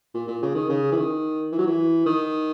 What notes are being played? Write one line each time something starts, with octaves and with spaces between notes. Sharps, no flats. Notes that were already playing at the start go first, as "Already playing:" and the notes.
A#2
A#2
C#3
D#3
C#3
E3
D#3
E3
F#3
E3
D#3